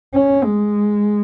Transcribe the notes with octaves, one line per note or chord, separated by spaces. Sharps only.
C#4
G#3